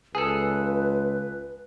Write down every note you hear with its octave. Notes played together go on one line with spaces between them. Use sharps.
C#2 G#4 A4 B4